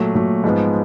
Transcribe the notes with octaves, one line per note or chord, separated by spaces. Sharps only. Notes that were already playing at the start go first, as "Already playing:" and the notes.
Already playing: A#2 F#3 A3
A#2 F#3 A3
G#2 F3 G#3 B3